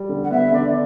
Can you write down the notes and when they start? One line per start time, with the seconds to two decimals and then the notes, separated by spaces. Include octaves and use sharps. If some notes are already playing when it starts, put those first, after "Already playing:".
Already playing: G3
0.09 D3
0.24 F#5
0.31 B3 E5
0.52 D3 D5